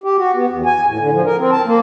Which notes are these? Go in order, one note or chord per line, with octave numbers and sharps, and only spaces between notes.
G4
F#4
B3
E2
G#5
A2
D3
F3
A#4
C4
A5
A#3